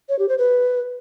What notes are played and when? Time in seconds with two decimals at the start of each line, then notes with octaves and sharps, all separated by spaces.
0.09 C#5
0.19 G4
0.29 C5
0.38 B4